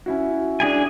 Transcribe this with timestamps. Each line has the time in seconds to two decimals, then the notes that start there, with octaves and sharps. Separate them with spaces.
0.06 C#4 E4 F#4
0.60 D4 G#4 G#5